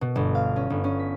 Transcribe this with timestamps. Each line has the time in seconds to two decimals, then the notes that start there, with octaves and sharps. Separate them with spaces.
0.01 B2
0.16 G1
0.35 F5
0.56 C#4
0.70 G1
0.84 C#4
0.99 B6